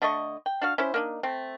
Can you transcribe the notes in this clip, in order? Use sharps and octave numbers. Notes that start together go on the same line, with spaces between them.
D3 A3 D#5 C#6
G5
D4 F#4 F5
C#4 E4 C5
A#3 D4 D#4
A3 C4